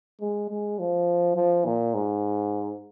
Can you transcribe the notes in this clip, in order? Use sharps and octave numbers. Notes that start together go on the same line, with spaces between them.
G#3
G#3
F3
F3
A#2
G#2